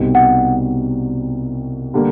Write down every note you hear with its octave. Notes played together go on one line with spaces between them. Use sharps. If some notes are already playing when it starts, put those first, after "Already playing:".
Already playing: C2 B2 G3 C4 D#4
F#5
D3 G3 A#3